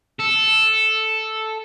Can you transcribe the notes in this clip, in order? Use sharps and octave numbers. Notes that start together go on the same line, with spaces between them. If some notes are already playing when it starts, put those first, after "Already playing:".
A4